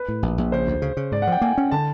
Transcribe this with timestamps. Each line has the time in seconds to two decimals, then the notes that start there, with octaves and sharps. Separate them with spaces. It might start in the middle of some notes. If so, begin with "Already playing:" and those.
Already playing: B4
0.08 A2
0.23 A#1
0.38 A#1
0.52 C#3 C5
0.67 D2
0.82 C#3
0.97 C#3
1.12 G#2 D5
1.22 F#5
1.27 F3 G5
1.41 A#3 G#5
1.58 C#4
1.71 D3 A5